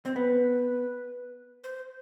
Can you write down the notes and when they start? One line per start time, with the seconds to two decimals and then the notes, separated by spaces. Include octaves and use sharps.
0.05 C4 C5
0.16 B3 B4
1.64 C5